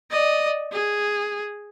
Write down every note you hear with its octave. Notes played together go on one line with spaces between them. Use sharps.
D5 D#5
G#4